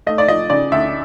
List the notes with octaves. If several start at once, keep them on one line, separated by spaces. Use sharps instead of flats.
A3 D#5
D5
F3 D#5
C#3 D5
D2 E5